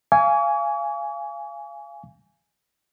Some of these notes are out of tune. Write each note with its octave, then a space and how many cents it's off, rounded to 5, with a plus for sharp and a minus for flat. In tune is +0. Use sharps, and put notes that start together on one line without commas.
F5 -25 G#5 +0 C#6 +45